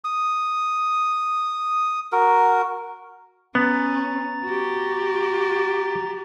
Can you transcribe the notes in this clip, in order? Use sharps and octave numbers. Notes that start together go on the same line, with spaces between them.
D#6
F#4 A#4
B3 C#4 A#5 A6
F#4 G4